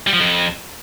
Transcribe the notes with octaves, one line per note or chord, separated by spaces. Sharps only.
G3
F3
F2